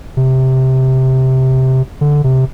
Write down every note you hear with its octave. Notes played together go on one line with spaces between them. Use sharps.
C3
D3
C3